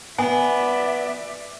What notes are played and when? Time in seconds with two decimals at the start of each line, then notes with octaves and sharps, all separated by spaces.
0.19 B3 D5 E5 G#5